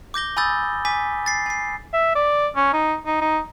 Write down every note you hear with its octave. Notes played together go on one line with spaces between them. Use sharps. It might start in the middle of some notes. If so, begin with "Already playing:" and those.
D6 G6 A#6 G7
G#5 B5 D#6 E6 G6 A6
G#5 D6 B6
A6 C7
G#5 C7
E5
D5
C#4
D#4
D#4
D#4